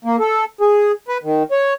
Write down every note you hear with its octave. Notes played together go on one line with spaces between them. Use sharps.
A#3
A4
G#4
B4
D#3
C#5